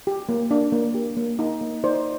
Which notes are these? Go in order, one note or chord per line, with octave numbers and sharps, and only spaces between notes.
G4
A#3
D4
A#3
G4
A#3
D#4
A#3
D#4 C5 D5